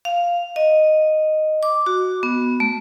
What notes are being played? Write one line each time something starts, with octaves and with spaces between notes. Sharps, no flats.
F5
D#5
D6
F#4
B3
A3